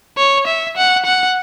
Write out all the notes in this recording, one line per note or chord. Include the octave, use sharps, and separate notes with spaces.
C#5
E5
F#5
F#5